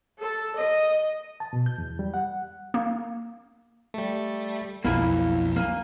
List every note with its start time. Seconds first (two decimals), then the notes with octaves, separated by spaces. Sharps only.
0.18 A4
0.57 D#5
1.40 A5
1.53 B2
1.66 G6
1.78 E2
1.99 G3
2.14 F#5
2.74 A#3
3.94 G3 A3
4.85 B1 F2 A#3 E4 G#5
5.56 A#3 G#5